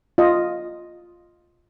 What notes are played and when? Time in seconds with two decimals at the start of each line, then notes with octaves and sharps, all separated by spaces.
0.18 F4 D#5